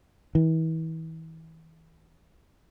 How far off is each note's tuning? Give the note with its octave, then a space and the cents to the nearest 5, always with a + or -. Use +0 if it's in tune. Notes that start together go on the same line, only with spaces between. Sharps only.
E3 -40